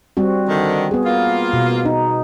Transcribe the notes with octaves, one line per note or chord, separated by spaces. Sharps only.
G3 C4 F#4
D3 D#3
B3 G#4
A#3 F4
B2
D#4